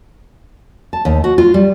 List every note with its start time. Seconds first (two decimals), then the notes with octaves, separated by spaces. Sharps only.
0.93 A5
1.05 D#2
1.24 F#4
1.38 F4
1.54 G3